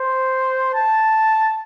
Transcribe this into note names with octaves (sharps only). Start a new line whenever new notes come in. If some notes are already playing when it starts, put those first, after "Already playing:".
Already playing: C5
A5